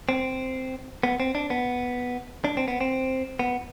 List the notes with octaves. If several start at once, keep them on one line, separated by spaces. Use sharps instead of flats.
C4
B3
C4
D4
B3
D4
C4
B3
C4
B3